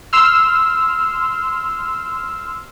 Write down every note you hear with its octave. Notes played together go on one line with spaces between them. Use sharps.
C6 E6 F6